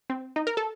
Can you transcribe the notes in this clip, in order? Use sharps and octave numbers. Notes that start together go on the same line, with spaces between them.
C4
D#4
A#4
A4